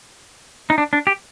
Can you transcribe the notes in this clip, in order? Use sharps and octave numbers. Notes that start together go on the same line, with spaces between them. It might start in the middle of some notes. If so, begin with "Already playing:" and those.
D#4
D4
D4
G4